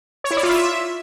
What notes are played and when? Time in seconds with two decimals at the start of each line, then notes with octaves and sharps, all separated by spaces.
0.24 C#5
0.31 E4
0.37 D5
0.43 F4
0.50 E5